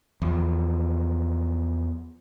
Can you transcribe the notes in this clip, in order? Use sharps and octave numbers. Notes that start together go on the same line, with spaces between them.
E2 F3